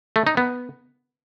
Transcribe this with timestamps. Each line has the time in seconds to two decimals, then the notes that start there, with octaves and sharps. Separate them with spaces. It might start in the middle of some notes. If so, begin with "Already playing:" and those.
0.16 A3
0.27 D#4
0.37 B3